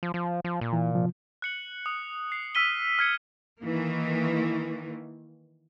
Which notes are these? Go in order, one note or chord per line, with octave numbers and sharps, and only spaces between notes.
F3
F3
F3
A#2
E3
C3 F3
F#6 C#7 F#7
D#6
C7
E6 F6 B6 D#7 G7
F6 G#6 C#7
D#3 E3 A#3